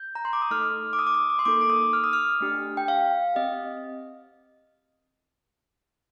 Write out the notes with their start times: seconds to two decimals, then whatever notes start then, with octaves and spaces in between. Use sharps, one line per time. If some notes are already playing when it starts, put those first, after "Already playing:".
Already playing: G6
0.15 A#5
0.25 C6
0.33 D6
0.42 D#6
0.51 A3 D#4 A4 F6
0.93 D6
0.99 D#6
1.07 D6
1.14 D#6
1.30 D6
1.39 C6
1.45 A#3 D#4 A4 D6
1.61 D6
1.70 D#6
1.93 F6
2.04 D#6
2.13 F6
2.41 A3 D4 G4
2.77 G5
2.88 F5
3.35 C4 G4 D#5